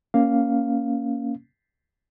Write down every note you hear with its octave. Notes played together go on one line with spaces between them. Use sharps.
A#3 C#4 F5